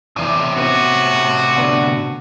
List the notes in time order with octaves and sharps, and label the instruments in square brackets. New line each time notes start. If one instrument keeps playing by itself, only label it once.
[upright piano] E2 D5 D6 [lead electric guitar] A2 C3
[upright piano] B3 C4 [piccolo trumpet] F#4
[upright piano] D3 B3 D4